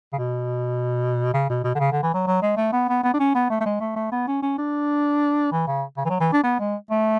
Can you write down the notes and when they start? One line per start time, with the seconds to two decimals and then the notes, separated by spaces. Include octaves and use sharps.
0.13 C#3
0.18 B2
1.34 C#3
1.49 B2
1.64 B2
1.75 D3
1.79 C#3
1.92 D3
2.03 E3
2.14 F#3
2.27 F#3
2.42 G#3
2.57 A3
2.72 B3
2.89 B3
3.03 B3
3.14 D4
3.20 C#4
3.35 B3
3.50 A3
3.60 A3
3.66 G#3
3.81 A3
3.96 A3
4.12 B3
4.27 C#4
4.42 C#4
4.58 D4
5.52 E3
5.67 C#3
5.97 C#3
6.05 E3
6.10 F#3
6.20 E3
6.32 D4
6.44 B3
6.59 G#3
6.91 A3